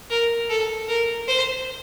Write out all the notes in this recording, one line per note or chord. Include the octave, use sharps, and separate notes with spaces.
A#4
A4
A#4
C5